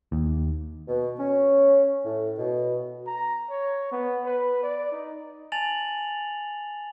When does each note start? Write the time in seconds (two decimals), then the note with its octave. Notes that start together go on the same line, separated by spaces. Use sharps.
0.12 D#2
0.88 B2
1.19 C#4
2.05 A2
2.38 B2
3.07 A#5
3.50 C#5
3.92 B3
4.26 B4
4.63 D5
4.92 D#4
5.52 G#5 A5 A6 F7 F#7